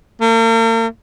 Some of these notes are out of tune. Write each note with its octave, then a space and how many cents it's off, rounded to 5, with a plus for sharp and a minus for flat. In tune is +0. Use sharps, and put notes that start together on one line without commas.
A#3 -45